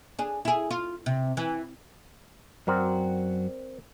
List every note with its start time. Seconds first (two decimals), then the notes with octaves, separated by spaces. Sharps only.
0.19 D4 G#4
0.45 E4 G#4
0.71 F4
1.06 C3
1.37 E3
2.67 F#2 F#3 C4 F#4 A#4 D5